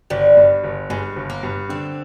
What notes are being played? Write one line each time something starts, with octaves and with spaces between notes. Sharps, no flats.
G1 G3
G2
G1
G2 G#3
G1
A#3
G2
D3 C4